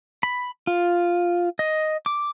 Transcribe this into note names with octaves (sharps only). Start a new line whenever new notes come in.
B5
F4
D#5
D6